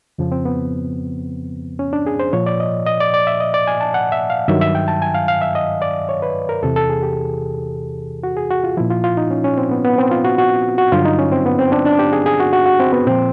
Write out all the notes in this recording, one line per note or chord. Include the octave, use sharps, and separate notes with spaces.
F2 C#3 F3
C4
B3
C#4
D4
G#4
C5
A#2 F3 C#5
D5
D#5
D#5
D5
D5
E5
D#5
D5
G#5
A5
F#5
E5
F5
G2 D#3 F#3 E5
E5
G5
A5
G#5
F5
F5
E5
D#5
D5
C#5
B4
A#4
E2 C3 E3 A4
A4
G#4
G4
F#4
G#4
F#4
F4
A#2 F3 E4
F4
F4
D#4
C#4
C#4
C4
B3
B3
C4
F4
F#4
F#4
F#4
G2 D3 F#3 F4
D#4
C#4
C4
B3
C4
D4
D4
G4
G#4
G#4
F#4
F#4
F#4
C4
B3
A#2 F3 C4